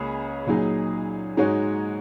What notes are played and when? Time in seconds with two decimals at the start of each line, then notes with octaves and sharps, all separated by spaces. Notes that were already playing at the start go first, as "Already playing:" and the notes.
Already playing: C#2 C#3 A#3 C#4 G#4
0.47 A#2 F#3 D#4 G#4
1.37 G#2 G#3 D#4 F#4 C#5